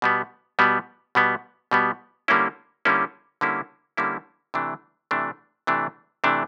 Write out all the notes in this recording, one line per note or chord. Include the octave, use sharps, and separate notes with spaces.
B2 G3 B3
B2 G3 B3
B2 G3 B3
B2 G3 B3
D3 G3 A#3 C#4 E4
D3 G3 A#3 C#4 E4
D3 G3 A#3 C#4 E4
D3 G3 A#3 C#4 E4
C3 E3 A3 D4
C3 E3 A3 D4
C3 E3 A3 D4
C3 E3 A3 D4